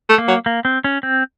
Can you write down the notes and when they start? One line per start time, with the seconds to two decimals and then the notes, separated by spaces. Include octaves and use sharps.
0.09 A3
0.18 A#3
0.28 F#3
0.46 A#3
0.65 C4
0.84 C#4
1.03 C4